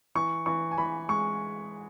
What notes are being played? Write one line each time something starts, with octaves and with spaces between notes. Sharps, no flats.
E3 C#6
E3 C#6
G#5
E3 B5
G#3 C#6